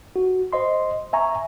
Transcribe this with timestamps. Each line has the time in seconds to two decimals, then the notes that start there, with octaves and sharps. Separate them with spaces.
0.16 F#4
0.53 C5 D#5 C6
1.13 E5 G#5 A#5 C#6